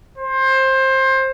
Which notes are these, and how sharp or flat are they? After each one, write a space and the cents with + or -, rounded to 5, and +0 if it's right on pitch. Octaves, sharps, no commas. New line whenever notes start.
C5 +20